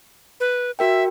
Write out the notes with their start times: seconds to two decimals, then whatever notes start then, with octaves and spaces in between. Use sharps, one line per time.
0.40 B4
0.79 F#4 A#4 E5 G5